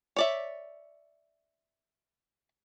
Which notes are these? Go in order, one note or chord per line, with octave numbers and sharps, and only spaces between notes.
C#5 D5 E5